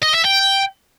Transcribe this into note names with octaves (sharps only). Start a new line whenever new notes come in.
D#5
E5
G5